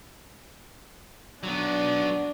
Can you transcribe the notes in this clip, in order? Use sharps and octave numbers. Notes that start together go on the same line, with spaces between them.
F#3 B3 D4